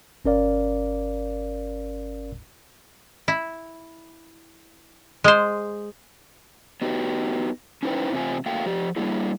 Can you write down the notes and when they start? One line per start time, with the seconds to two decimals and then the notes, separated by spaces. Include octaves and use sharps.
0.25 G1 C#4 A#4 D5 F5
3.28 E4
5.24 G#3 C5
6.82 B3 D#4 F#4 G4
7.83 C#4 D#4 E4 B4 C5 G5
8.12 E2 C3 C4 D4 F4 G#5
8.46 A3 A#3 F#4 F5 G5
8.66 F3 G4
8.96 G3 A#3 D4 E4 G#4